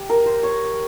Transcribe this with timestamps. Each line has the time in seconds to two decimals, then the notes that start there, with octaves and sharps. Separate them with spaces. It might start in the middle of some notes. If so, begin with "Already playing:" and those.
Already playing: G4
0.10 A#4
0.26 C5
0.43 C#5